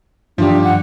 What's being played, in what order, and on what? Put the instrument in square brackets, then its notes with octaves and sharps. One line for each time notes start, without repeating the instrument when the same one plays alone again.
[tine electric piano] G2 D#3 G3 [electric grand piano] F3 G4 [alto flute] D4
[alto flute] F#5